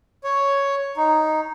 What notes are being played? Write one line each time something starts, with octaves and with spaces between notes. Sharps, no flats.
C#5
D#4